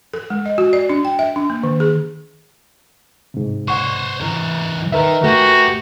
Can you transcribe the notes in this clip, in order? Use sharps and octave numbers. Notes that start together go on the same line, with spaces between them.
A4
G#3
D#5
F#4
D5
D4
G5
E5
D4
A#3
D#3
G#4
G#2 C3
C5 C#5 F#5 C#6
E3 A#4
D#3 A#4 B4 E5
A3 F#4 G4 G#5